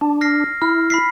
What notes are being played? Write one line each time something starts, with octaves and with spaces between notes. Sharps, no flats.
D4
F6 A#6 C7
E4 F6
B5 B6 C7